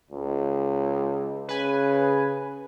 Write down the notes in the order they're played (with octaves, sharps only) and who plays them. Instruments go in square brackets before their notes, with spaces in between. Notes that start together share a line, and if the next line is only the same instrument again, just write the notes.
[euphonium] C#2
[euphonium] C#3 [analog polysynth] B4 G#5